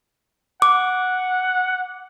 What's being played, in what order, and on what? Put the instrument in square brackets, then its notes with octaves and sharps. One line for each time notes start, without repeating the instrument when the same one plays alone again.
[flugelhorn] F#5 [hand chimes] D6